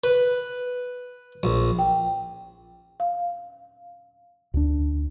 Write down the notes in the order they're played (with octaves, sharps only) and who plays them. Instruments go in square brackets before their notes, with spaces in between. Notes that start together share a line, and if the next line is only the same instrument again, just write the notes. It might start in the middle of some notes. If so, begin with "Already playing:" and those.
[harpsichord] B4
A#1
[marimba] G5
F5
[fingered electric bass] D2 D4